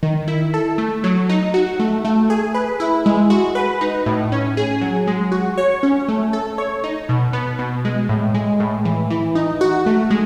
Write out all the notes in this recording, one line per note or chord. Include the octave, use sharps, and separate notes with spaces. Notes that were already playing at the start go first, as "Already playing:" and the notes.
D#3
E4
A4
A3
F#3
D#4
F#4
A3
A3
G#4
B4
E4
G#3
F#4
B4
D#4
A2
C#4
G#4
F#3
G#3
F#4
C#5
C#4
A3
A4
C#5
D#4
B2
B3
B2
G#3
A2
G#3
A2
E3
E3
D#4
F#4
A3
G#3